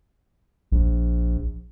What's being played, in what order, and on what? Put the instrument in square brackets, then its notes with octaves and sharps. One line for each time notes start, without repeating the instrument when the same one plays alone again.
[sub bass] A#1